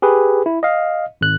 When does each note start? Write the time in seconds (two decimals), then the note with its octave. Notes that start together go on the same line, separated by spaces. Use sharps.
0.02 G4 G#4 B4
0.46 E4
0.63 D#5 F5
1.21 G#1 F#6